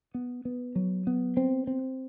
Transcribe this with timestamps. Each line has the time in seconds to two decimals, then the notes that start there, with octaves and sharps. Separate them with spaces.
0.14 B3
0.45 B3
0.75 F#3
1.07 B3
1.37 C4
1.67 C4